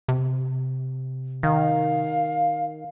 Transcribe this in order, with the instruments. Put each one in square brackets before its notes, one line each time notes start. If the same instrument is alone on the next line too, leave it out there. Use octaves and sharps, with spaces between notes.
[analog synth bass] C3
[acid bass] D#3 [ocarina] F5